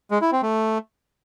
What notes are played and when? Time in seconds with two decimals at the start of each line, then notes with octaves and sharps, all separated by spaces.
0.11 G#3
0.21 E4
0.32 C4
0.43 A3